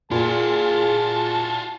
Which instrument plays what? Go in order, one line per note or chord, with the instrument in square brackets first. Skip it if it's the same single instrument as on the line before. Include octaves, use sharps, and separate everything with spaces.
[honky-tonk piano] A#2 [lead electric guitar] F4 F#4 [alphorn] G#4 [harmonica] A5